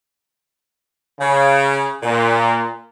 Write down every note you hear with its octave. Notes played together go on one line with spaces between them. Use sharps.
C#3
A#2